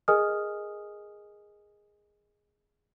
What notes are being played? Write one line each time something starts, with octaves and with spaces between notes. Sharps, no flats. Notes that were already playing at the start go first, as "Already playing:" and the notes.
G#4 A#4 D#5 G#5 D#6 F6